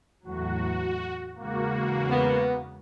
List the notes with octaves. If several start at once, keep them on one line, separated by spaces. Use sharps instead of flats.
E2 A2 F#3 F#4
E2 G#2 C#3 A#3 F#4
B3